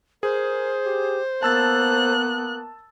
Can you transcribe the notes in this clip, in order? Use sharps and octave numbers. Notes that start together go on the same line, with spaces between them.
G#4 A#4 C5
G4
A#3 B3 A5 E6 F#6 A6